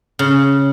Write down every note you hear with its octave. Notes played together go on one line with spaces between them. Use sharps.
C#3